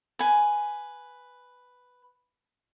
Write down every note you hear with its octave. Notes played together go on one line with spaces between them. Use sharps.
B4 G#5